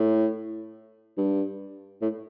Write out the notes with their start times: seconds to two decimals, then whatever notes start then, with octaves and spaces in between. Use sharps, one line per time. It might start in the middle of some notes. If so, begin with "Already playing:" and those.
Already playing: A2
1.18 G2
2.02 A2